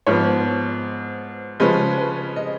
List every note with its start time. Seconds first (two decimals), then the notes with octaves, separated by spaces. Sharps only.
0.07 G#2 F3 B3 C#5
1.60 C#3 F3 G#3 C#4 B4
1.98 B4
2.36 D#5